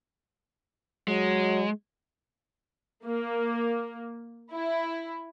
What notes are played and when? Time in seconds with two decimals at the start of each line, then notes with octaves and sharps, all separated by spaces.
1.08 F#3 G#3
3.06 A#3
4.53 E4